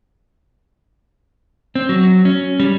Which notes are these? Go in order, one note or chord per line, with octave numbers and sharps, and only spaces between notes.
C4
F#3
C#4
G3